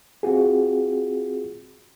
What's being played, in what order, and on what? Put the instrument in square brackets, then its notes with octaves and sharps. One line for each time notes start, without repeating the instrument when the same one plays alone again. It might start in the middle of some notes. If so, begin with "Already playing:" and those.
[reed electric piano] C4 F4 F#4 G#4